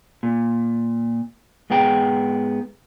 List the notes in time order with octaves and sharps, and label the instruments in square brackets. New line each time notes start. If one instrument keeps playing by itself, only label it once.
[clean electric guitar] A#2
G#2 B3 G#4 G5 A#5